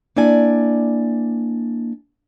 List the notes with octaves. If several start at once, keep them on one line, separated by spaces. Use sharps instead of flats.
A#3 D4 E4 D5 G#5